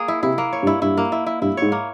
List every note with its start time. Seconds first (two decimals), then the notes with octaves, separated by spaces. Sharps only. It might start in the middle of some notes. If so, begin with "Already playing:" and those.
Already playing: A#3 G#4
0.08 E4
0.23 C3 E4
0.38 A#3
0.53 C#5
0.63 G2
0.67 E4
0.82 G2 E4
0.97 A#3
1.12 E4
1.26 E4
1.42 G2 E4
1.57 G#2 C#5
1.72 A#3